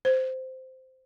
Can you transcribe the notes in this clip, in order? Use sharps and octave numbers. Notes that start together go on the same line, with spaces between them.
C5